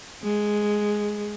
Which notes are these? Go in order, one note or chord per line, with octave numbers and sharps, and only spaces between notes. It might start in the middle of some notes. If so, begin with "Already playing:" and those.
G#3